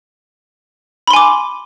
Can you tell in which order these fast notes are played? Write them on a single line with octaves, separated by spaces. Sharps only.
B5 C6 G#5 D6